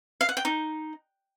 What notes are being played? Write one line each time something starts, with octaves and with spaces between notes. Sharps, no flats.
F5
F#5
G5
D#4